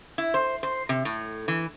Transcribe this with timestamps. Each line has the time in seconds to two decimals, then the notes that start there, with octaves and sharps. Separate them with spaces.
0.18 E4
0.34 C5
0.63 C5
0.89 C3
1.05 A2
1.48 E3